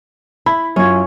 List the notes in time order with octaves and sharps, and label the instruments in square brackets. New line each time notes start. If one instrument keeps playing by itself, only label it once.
[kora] E4 [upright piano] B5
[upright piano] F#2 F4 [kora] C#4 C#5